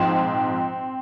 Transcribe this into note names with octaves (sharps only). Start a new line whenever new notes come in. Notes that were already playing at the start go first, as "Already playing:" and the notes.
Already playing: A#1 G#2 F3 C4